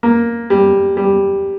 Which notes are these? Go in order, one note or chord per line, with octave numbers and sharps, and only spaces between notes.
A#3
G3
G3